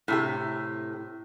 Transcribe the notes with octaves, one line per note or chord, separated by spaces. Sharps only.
A2 C3 G4